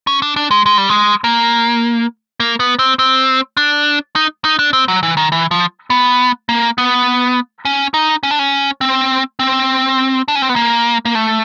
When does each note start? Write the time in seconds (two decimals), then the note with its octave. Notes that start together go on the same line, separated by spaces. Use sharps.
0.07 C#4
0.22 D4
0.36 D4
0.51 G#3
0.66 G#3
0.78 G3
0.89 G#3
1.24 A#3
2.40 A#3
2.60 B3
2.79 C4
2.99 C4
3.57 D4
4.16 D#4
4.45 D#4
4.59 D4
4.73 C4
4.88 F#3
5.03 E3
5.17 D#3
5.32 E3
5.51 F3
5.90 B3
6.49 A#3
6.78 B3
7.65 C#4
7.94 D#4
8.23 C#4
8.31 D4
8.39 C#4
8.81 C4
9.39 C4
10.28 D4
10.35 C#4
10.42 C4
10.49 B3
10.56 A#3
11.05 A#3
11.15 A3